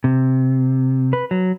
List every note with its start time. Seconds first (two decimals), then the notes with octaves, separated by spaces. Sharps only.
0.04 C3
1.13 B4
1.31 F#3